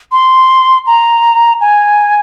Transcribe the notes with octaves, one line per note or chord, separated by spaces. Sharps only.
C6
A#5
G#5